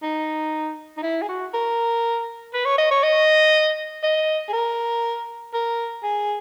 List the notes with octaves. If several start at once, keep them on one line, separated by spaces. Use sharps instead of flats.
D#4
D#4
E4
G#4
F#4
A#4
B4
C#5
D#5
C#5
D#5
D#5
G#4
A#4
A#4
G#4